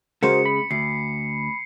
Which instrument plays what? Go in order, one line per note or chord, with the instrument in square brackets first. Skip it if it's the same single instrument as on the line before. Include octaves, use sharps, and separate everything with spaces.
[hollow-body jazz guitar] C#3 G#3 [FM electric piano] F#4 A#4 C5 [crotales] C#7
[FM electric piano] B5
[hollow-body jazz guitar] D2 [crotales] C7